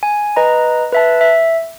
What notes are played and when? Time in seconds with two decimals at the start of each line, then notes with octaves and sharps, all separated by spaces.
0.03 G#5
0.36 B4 D#5 A#5
0.92 B4 E5 A5
1.21 E5